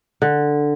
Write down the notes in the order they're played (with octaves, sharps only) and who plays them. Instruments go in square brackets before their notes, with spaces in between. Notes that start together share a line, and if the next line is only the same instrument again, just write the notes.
[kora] D3